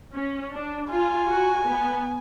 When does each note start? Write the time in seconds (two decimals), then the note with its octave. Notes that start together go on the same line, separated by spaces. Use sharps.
0.14 C#4
0.53 D4
0.90 F4 G#5
1.30 F#4
1.67 B3